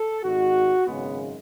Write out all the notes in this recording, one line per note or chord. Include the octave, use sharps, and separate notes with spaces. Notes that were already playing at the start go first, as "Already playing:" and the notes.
Already playing: A4
G#1 G#2 G#3 F#4
G#1 F#2 C#3 G#3 B3